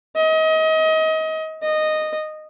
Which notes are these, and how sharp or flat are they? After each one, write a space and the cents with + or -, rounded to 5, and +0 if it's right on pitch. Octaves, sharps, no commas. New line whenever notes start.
D#5 +30
D#5 -10